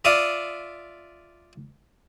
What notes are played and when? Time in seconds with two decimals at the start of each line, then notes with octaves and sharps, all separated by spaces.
0.05 F4 D5 E5 F5 D#6